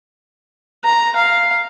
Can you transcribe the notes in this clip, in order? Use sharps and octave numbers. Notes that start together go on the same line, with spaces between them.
A#5
F5